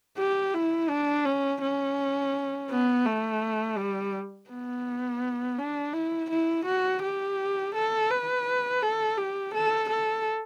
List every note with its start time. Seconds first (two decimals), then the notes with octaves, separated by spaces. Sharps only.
0.18 G4
0.54 E4
0.89 D4
1.26 C#4
1.62 C#4
2.70 B3
3.05 A3
3.78 G3
4.50 B3
5.58 D4
5.93 E4
6.30 E4
6.65 F#4
7.02 G4
7.74 A4
8.10 B4
8.82 A4
9.17 G4
9.54 A4
9.89 A4